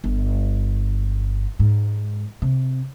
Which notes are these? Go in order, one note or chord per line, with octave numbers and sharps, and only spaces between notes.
G1
G#2
C3